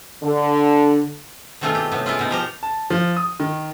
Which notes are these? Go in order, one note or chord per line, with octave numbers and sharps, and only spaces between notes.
D3
B2 D#3 A3 C4 F4 G#4
G4
A2 C3 B3
G#3 E4 F4
B2 D#4
F3 G4 A#4
A5
F3
D#6
D#3